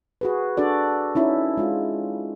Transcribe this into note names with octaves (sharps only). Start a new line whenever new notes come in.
F#4 G#4 B4
D4 F#4 A4 D5
C#4 D#4 E4
G#3 F4